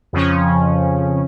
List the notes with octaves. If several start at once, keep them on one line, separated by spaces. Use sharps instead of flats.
F2 C#3 F3 C#4